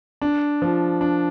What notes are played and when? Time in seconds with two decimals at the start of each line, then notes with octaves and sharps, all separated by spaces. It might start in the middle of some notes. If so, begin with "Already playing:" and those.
0.21 D4
0.62 F3
1.01 D4